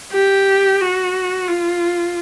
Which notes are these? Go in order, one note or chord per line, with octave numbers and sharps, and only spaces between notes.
G4
F#4
F4